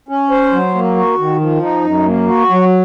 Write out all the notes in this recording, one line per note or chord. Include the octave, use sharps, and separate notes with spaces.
C#4
C5
F#3
A#3
F#4
D#3
F3
D#4
F#2
A#3
F#4
F#3